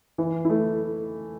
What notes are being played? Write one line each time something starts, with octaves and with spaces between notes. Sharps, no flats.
E3
A3 E4